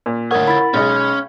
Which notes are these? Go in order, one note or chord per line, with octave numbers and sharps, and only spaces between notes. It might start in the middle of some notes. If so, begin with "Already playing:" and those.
A#2
D2 F4 A#4 C#5 F#5 D#6
E4 B5 A6
B1 G#3 C#4 D#5 B5